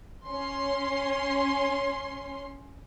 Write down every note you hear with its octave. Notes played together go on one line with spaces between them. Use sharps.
C#4 C6